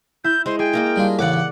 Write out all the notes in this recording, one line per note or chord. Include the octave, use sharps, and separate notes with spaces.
E4 G6
G#3 C5
G#4 G5
G#3 A#3 A#4
G3 D4 F4
A1 D#2 C#3 D5 F#5 D6